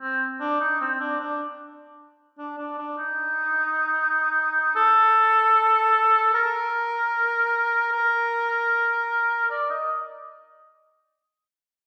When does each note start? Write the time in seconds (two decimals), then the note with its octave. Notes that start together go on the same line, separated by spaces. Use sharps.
0.02 C4
0.40 D4
0.61 D#4
0.81 C4
1.00 D4
1.20 D4
2.39 D4
2.58 D4
2.78 D4
2.98 D#4
4.76 A4
6.34 A#4
7.92 A#4
9.50 D5
9.70 D#5